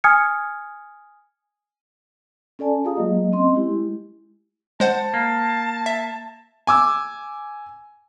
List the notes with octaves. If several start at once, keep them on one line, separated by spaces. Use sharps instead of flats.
G#5 D#6 F6 G#6 C#7
C#4 A4 D5 G#5 A5
F4 G4 G#4 F5 A#5 D#6
F#3 G#3 A#3 D#5
C4 C#4 D#5 C6
G#3 E4 G4
G#3 C5 F#5 A5
A#3
E5
G#5 D6 E6